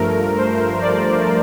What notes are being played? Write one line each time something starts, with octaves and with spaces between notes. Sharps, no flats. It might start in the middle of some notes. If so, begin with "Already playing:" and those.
Already playing: G2 F3 A3 A#4
C5
D5